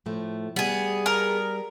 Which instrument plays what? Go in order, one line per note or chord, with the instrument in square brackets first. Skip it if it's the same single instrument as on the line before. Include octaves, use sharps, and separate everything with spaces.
[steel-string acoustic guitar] A2 F3 A3
[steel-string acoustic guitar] G3 [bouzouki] B3 G#4
[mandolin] A#4